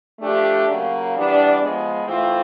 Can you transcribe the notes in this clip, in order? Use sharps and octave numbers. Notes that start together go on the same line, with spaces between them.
F3 A3 D4 G4
C#3 F#3 A#3
E3 G3 B3 D4
F3 G#3 B3
E3 A3 C4 F4